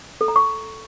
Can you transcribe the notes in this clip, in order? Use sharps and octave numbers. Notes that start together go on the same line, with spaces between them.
A4
A#5
C#6